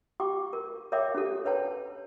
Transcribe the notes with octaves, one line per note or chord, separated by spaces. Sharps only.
G4 G5 C#6 D6
A#4
A#4 C#5 E5 G5 D6
C#4 D4 G4 A4
B4 C#5 G5 A5